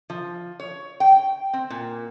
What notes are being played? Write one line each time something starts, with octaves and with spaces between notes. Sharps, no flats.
F3
C#5
G5
C4
A#2